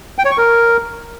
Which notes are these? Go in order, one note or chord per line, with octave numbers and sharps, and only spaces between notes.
G5
C#5
C#6
A#4